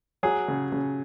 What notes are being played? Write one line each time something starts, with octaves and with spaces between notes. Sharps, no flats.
F#3 G#4
C#3
C#3